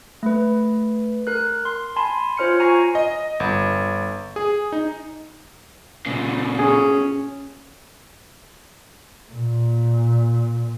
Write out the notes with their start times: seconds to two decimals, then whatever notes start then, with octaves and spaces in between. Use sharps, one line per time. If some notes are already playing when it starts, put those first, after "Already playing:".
0.23 A3 B4
1.27 A#4 F#6
1.65 C6
1.96 G#5 A5 B5 C6
2.37 F4 C5 C#5 F6 G6 C#7
2.59 F4 G#5 A#5 C#6 A#6 C7
2.95 D#5
3.40 G1
4.36 G#4
4.72 D#4
6.06 A#2 C#3
6.59 C#4 G#4
9.32 A#2